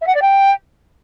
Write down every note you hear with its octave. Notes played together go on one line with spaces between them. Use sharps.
E5
F#5
D5
G5